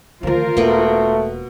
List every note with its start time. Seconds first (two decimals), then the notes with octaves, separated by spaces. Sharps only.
0.23 D2 D#3 F3 F4 A#4 C5
0.57 E1 B2 A3 A#3